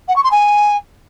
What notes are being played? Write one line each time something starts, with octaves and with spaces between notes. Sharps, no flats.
F#5
C#6
C6
G#5